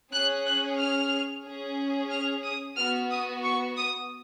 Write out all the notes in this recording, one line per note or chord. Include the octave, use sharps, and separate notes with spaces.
C#4 G#4 F#6
F#6
F6
C#4 G#4
F6
D#6
B3 F#4 F6
D#6
C#6
D#6